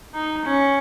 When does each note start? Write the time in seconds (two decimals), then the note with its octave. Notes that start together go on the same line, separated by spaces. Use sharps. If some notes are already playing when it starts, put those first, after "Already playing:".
0.14 D#4
0.45 C#4